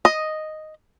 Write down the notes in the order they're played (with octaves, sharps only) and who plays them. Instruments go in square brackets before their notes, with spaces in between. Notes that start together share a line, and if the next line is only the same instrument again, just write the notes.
[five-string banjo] D#5